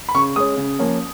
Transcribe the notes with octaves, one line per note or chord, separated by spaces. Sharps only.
B5
C#3 C#6
G#3 C#4 D#6
C#3
F3 A#3 C#4